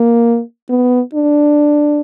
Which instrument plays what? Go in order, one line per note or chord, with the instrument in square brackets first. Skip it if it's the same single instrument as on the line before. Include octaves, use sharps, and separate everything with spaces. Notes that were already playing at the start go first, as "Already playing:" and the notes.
Already playing: [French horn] A#3
B3
D4